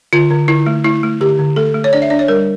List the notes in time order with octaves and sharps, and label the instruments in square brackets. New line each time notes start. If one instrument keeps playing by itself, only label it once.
[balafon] D3 F4
D3
D3 E4
A3
A3 E4
A3
D3 G4
D3
A3 A4
A3
C#5
D4 D5
E5
D4 D5
C#5
G3 A#4